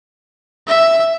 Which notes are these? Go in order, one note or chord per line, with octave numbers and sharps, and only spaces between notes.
E5